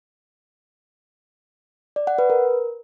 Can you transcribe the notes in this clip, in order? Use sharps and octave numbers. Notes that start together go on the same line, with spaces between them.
D5
F#5
B4
A#4